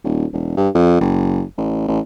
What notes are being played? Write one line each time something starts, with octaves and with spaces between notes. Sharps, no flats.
D#1
E1
G2
F2
F#1
A1
A1